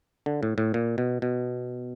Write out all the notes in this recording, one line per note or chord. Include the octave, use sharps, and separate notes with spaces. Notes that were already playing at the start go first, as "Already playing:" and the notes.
D3
A2
A2
A#2
B2
B2